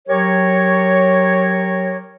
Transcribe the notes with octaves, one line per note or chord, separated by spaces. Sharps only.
F#3 G4 A#4 C#5